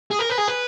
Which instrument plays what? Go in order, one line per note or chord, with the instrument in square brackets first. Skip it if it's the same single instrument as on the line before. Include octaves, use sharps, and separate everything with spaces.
[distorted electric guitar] G#4
A#4
B4
G#4
B4